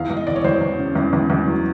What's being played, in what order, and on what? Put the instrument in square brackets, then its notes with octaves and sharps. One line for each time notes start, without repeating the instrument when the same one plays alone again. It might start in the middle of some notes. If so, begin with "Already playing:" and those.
Already playing: [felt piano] E2 F5
E2
D#5
E2 D5
C#5
E2 C5
E2
C#3
E2
E2
E2
F#3